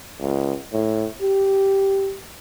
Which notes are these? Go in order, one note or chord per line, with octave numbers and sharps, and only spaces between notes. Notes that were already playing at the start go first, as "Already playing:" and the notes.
C#2
A2
G4